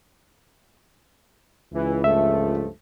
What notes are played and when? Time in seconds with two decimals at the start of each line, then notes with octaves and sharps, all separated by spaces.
1.73 C#2 E3
2.04 G2 F3 A3 E5